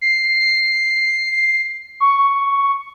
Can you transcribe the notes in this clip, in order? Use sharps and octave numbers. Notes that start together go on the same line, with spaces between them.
C7
C#6